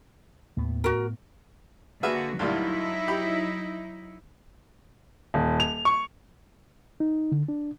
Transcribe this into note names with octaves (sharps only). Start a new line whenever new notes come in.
D#2 A2 B3
F#4 A#4
D3 A#3 F#4 G#4 B4 E5
D2 G2 A#2 F#3 D#4 E4
G4 B5
D#1
F7
C#6
D#4
D3
D4